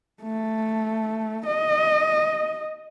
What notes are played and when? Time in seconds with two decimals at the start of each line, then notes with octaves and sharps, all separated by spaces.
0.23 A3
1.47 D#5